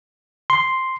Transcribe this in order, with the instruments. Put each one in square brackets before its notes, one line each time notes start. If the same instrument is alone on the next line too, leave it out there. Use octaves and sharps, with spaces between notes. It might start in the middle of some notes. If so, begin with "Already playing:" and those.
[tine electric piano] C6